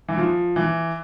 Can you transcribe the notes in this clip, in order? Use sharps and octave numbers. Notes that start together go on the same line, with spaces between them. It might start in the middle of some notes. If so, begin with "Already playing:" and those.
E3
F3
E3